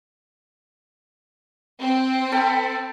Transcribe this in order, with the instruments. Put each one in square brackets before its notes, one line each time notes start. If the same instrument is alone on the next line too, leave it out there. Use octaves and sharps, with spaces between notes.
[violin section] C4
[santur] A4 G5 B5